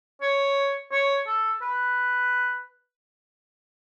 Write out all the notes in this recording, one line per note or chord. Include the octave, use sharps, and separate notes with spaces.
C#5
C#5
A4
B4